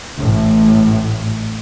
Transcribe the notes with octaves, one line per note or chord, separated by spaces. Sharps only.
A1 A2